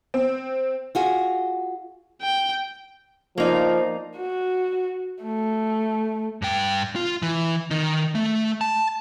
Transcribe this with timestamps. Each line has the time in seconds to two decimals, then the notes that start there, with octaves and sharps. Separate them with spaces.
0.14 C4
0.95 F4 F#4 G#4
2.22 G5
3.38 F3 A#3 D#4 D5
4.17 F#4
5.24 A3
6.42 G2 G5
6.96 F4
7.22 E3
7.71 D#3 D#4
8.15 A3
8.61 A5